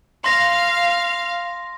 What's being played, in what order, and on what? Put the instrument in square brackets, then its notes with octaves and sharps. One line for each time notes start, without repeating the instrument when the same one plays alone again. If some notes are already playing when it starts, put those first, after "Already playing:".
[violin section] F5 [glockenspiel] C6 A#6